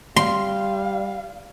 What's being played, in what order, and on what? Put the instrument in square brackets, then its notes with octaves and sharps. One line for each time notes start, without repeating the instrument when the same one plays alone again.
[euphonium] G3 [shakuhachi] F5 [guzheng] C6